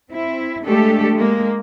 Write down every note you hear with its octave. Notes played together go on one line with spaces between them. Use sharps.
C4 E4
G#3 A3 D4 G4 A4
G#3 A#3